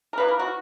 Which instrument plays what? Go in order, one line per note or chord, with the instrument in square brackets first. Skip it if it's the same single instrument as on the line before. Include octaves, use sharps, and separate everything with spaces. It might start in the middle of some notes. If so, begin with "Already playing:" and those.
[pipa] A#4
B2 A#3 D#4 B4
A#4
F#4